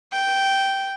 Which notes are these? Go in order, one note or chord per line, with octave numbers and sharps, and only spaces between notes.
G5